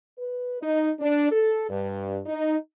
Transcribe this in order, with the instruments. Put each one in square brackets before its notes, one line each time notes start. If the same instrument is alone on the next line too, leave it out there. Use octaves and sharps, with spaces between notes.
[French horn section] B4
D#4
D4
A4
G2
D#4